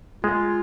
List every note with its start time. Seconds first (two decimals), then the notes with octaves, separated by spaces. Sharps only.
0.24 G#3 F4